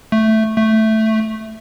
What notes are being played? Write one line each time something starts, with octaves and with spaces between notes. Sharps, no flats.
A3
A3